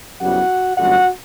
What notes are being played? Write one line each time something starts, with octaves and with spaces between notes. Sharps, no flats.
F#2 C#3 G3 B3 E4 F#4 F#5
G1 F#2 D3 A3 F#4 F#5